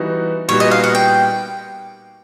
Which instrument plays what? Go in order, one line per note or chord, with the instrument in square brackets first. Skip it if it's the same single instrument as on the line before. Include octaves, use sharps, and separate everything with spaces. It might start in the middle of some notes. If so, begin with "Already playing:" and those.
Already playing: [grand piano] E3 G3 B3 D#4 F#4
[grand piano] A#2 G3 B3 D#4 F#4 [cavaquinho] C#5
[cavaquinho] D#5
F5
F#5
G5